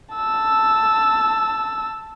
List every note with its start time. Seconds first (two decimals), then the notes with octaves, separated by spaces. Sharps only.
0.15 A5 E6